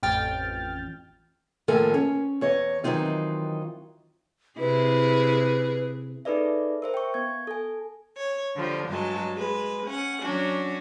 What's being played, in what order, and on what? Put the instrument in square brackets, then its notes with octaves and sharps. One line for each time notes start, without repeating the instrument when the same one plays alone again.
[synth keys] A1 F2 G5 F6 A6
[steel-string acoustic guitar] D#2 A2 F3 A4 A#4 G#5
C#4
E2 C#5 D#5
D#3 E3 F#3 C4 D#4 F4
[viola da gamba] C3 E4 G#4 [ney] B4
[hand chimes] D#4 G#4 A4 B4 D5 E5
A#4 C5 E5
G5 C#6
B3 G#6
A4 G#5
[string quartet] C#5
D3 F3 G3
G2 F#3 G#3 A5
G#3 B4
C#4 F#5
F#3 C#4 D4 F#4